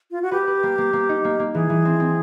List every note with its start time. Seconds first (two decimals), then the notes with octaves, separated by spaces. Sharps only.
0.11 F4
0.22 F#4
0.31 G4 B4
0.47 B4
0.63 A#3
0.78 A#3
0.93 A#3
1.09 D#4
1.24 A#3
1.39 A#3
1.54 E3 G#4
1.70 E3
1.85 C4
2.00 C4